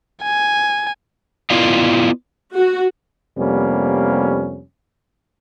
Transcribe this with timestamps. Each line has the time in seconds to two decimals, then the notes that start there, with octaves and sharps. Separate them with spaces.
0.24 G#5
1.50 B3 E4 F4 D5 D#5 F5
2.55 F#4
3.38 F2 C3 G3 A#3 B3 C#4